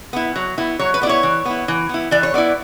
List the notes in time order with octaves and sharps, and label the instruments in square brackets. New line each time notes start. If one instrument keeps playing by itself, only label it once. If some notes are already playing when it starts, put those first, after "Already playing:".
[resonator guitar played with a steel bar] B3 E4
F#3
B3 E4
F#3 C#5
B4
B3 D5
E4 C#5
E3
B3 E4
E3
B3 E4
E3 D5
C#5
B3 E4 D5